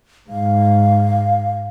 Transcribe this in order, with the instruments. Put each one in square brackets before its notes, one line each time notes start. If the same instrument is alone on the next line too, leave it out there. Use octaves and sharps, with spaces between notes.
[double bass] G#2 [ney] F5